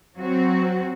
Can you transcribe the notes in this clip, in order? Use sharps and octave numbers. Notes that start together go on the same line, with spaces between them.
F#3 C4 F#4